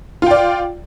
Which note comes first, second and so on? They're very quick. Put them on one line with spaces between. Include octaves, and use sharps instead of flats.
F4 G5 D5